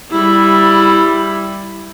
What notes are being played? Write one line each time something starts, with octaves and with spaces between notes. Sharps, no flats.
G3 E4